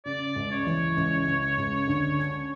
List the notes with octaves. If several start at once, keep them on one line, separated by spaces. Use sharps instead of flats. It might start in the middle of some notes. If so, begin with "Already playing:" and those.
C#3 D5
C#2
C#5
E3
C#2
C#3
C#2
D3
C#4